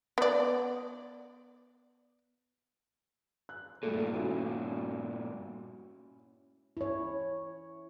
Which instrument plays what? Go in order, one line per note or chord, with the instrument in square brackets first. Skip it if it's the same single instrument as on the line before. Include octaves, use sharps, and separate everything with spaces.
[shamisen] B3 D5
[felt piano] F#6
[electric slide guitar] G2 A#2 [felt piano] A3
[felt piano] C#4 E4 F#4
[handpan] E4 C#5